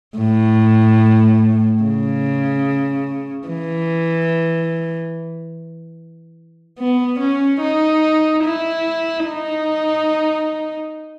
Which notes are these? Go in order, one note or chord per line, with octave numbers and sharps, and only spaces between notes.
A2
C#3
E3
B3
C#4
D#4
E4
D#4